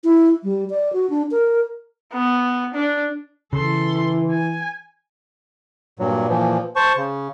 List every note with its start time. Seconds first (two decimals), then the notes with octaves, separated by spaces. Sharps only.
0.04 E4
0.44 G3
0.70 D5
0.93 F#4
1.10 D4
1.31 A#4
2.13 B3
2.74 D4
3.53 C#3 E3 A4 C6
4.31 G#5
5.99 G2 A#2 F#3
6.29 A#2 E3 F3
6.76 C5 A5 C#6
6.97 C#3